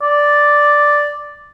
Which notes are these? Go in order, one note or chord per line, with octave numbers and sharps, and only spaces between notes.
D5